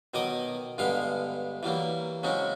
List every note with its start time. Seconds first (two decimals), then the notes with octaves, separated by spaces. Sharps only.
0.14 B2 D#3 F#3 D#5 D6 D#6
0.78 G2 D3 G#3 B3 F5
1.63 E3 F#3 G3 A#3
2.23 C#3 F#3 G#3 C4 C#4